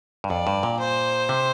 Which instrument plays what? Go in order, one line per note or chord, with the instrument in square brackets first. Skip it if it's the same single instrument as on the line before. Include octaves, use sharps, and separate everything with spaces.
[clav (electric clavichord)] G2
[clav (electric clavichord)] F2 [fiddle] D5
[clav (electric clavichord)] G2
A#2
[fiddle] C5
[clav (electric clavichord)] C3